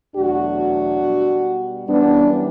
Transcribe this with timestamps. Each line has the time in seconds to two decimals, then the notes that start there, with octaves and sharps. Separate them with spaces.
0.14 E2 B2 F#3 A3 D4 F#4
1.02 B2 G3
1.87 F#2 E3 G3 B3 D4